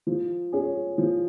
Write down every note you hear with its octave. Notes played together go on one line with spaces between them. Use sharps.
F3
C#4 G#4
F3